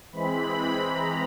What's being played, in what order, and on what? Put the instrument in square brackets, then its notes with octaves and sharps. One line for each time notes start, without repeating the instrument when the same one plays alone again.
[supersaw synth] E3 G#3 C4 B5
A#5